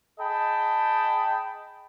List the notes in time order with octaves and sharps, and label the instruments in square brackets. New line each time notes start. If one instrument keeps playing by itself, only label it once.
[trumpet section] G#4 D#5 G5 A5 B5